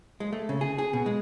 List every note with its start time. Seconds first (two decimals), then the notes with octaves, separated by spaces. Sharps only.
0.20 G#3
0.33 A3
0.49 C#3
0.61 G#4
0.78 G#4
0.93 B2
1.06 G#3